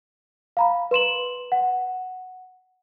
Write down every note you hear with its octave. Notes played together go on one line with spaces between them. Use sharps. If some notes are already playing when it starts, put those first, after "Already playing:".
F5 A#5 B5
B4 C6 E7 F#7
F#5